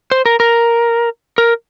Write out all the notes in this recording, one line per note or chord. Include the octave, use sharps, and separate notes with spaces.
C5
A#4
A#4
A#4